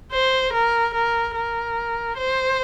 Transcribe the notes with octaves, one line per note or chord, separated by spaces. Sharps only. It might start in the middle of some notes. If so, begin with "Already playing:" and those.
C5
A#4
A#4
A#4
C5